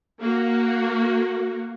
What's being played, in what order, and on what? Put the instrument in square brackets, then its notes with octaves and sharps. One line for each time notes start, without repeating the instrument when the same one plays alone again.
[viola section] A#3 F#4